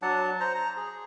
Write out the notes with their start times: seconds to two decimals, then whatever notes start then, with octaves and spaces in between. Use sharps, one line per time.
0.02 F#3 D4 F#5 A5
0.40 C5 A#5
0.55 A#5
0.77 G#4